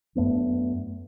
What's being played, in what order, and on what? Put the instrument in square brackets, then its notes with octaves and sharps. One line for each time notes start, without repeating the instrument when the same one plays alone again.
[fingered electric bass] F#2 A3 B3 D4